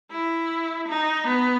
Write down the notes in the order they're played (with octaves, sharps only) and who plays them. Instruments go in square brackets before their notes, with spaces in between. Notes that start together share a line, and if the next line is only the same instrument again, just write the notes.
[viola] E4
D#4
B3